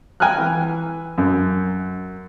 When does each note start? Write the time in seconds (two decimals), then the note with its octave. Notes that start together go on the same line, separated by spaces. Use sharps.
0.20 G5 G#5 A#5 F6 F#6
0.38 E3
1.18 F#2